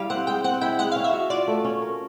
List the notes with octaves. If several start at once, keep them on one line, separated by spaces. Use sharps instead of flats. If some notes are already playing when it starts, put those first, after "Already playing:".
Already playing: G3 E4 F5
C4 F#5
G#3 G5
C4 F#5
E4 G5
G#3 F#5
F5
C#4
E5
F#4
F4 D5
A3
C#4
A#4